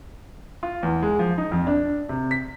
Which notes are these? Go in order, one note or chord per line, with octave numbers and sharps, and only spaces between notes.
F4
E2
G#3
F3
D#4
F2
D4
C3
B6